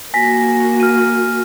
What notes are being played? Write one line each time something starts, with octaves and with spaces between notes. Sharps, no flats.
A#3 F#4 G#5 A#6 B6
F6 D#7